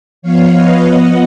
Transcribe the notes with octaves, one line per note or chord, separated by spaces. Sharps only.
F3 B3 C#5 F5
B4 D#5
F3 B3 D#5 F#5